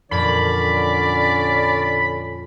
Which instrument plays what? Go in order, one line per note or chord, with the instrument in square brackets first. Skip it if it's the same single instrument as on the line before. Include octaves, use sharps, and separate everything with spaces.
[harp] F2 A#2 [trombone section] D3 C#4 [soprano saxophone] D5 [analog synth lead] B5